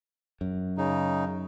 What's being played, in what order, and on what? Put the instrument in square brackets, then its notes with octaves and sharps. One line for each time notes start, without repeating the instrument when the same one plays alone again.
[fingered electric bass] F#2
[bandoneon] C#3 D#4